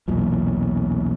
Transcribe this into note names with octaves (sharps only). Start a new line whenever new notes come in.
B1 E2 A#2